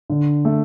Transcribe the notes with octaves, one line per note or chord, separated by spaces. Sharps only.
D3
A3